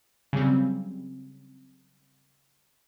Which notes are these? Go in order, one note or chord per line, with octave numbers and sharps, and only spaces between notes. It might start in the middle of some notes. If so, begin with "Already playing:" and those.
C#3 F#3 G3 C4